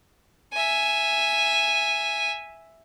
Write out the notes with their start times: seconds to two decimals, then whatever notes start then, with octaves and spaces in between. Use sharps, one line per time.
0.53 E5 G#5